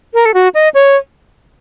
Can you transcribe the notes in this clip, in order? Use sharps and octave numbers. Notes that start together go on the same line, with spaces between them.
A#4
A4
F#4
D#5
C#5